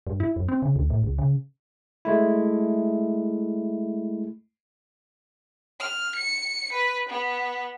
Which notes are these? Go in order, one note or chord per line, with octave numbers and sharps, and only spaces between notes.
G2
E4
F#2
C4
C#3
D2
A2
C#2
C#3
G#3 A3 E4
F6
C#7
B4
B3